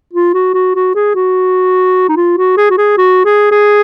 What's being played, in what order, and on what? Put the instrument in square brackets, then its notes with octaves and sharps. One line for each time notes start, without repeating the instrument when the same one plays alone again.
[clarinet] F4
F#4
F#4
F#4
G#4
F#4
D#4
F4
F#4
G#4
F#4
G#4
F#4
G#4
G#4